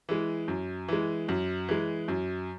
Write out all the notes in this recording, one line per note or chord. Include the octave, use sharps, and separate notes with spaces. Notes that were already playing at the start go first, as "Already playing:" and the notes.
E3 G#3
F#2
E3 G#3
F#2
E3 G#3
F#2